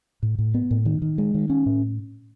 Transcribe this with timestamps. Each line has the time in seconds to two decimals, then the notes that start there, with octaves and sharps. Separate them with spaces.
0.23 A2
0.39 A2
0.54 B3
0.71 A2
0.86 D#3
1.02 D#3
1.18 G#3
1.34 D#3
1.50 C#4
1.66 A2